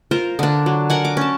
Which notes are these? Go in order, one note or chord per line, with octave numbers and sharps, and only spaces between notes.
F4 A#4 C5
D3 D4
F#3
A#4 F#5 G#5
D6
C#4 A5